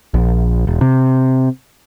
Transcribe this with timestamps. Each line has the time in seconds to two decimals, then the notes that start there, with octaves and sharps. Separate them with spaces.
0.14 A#1
0.67 E1
0.81 C3